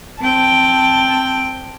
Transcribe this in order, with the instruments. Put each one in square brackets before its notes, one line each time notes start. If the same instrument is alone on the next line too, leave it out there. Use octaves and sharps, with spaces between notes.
[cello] C4 G5 [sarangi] A5